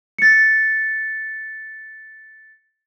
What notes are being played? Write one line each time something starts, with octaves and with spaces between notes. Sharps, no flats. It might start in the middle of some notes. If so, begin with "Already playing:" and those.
A6 C#7